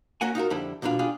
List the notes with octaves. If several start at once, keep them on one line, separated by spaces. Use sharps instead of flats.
A#3 C#4 F#4 F#5 G#5
D#4 F4 F#4 A#4
F2 D3 G3 E4
B1 E2 B2 D4 F4
D4 F4 G4 G#4